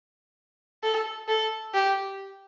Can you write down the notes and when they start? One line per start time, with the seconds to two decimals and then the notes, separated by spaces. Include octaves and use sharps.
0.83 A4
1.28 A4
1.74 G4